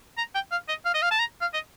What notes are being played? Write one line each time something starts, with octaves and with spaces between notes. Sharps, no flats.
A#5
G5
F5
D#5
F5
D#5
F5
A5
A#5
F5
D#5